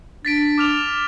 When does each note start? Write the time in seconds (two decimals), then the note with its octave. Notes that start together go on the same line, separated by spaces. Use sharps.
0.25 D4 A6 B6 D7
0.58 D6 F6 F7